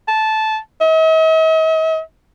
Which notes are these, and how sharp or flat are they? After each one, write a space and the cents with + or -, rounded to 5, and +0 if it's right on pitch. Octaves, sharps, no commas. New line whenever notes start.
A5 -15
D#5 +45